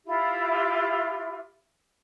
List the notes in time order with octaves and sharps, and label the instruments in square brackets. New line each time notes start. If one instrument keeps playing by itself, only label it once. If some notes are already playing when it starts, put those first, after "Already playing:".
[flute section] E4 F4 G4 E5